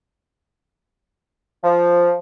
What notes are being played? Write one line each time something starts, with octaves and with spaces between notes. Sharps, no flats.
F3